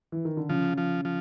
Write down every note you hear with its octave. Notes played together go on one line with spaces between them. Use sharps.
E3
D#3
D3
C#3 F3
F3
F3